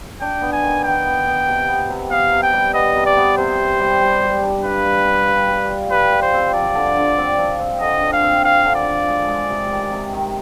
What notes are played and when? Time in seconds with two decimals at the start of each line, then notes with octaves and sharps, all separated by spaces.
0.21 D4 G5
0.42 B3
0.53 G#5
0.63 D#3
0.84 D#3 G5
1.06 B3
1.27 B3
1.47 C3
1.68 B3
1.90 C3
2.11 B3 F5
2.33 C3
2.43 G5
2.53 G3
2.74 B3 D#5
2.96 C3
3.06 D5
3.17 B3
3.38 C3 C5
3.59 C3
3.80 G3
4.01 G3
4.23 G3
4.43 D4
4.64 F4 B4
4.85 G3
5.06 F4
5.27 G3
5.49 G3
5.69 F4
5.91 G3 B4
6.12 F4
6.22 C5
6.34 C4
6.54 F3 D5
6.75 D3
6.97 D3
7.18 C4
7.39 F3
7.60 C4
7.81 D3 D#5
8.03 D3
8.13 F5
8.24 C4
8.44 F4 F5
8.65 D3
8.76 D5
8.86 F4
9.08 G#3
9.28 G#3
9.50 C3
9.71 D#3
9.91 C3
10.14 D#3